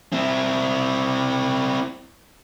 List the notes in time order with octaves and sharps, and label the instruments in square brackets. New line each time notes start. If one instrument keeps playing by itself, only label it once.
[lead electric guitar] C4 E4